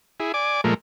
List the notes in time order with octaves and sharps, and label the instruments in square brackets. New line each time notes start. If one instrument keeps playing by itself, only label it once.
[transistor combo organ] E4 G#4
D5 G#5 D6
A#2 F3 G#3 A3 A#4